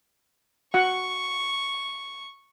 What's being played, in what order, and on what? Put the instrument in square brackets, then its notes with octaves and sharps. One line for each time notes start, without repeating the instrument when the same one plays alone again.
[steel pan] F#4 F#5 [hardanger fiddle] C#6